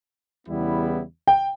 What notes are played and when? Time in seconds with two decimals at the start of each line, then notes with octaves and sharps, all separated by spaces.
0.46 E2 C#3 G3 B3 E4
1.27 G5